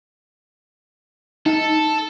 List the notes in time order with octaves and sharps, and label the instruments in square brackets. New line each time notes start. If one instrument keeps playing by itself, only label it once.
[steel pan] D#4 [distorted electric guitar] A4